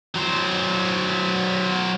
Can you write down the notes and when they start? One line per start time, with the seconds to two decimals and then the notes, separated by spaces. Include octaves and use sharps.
0.16 F#3 C5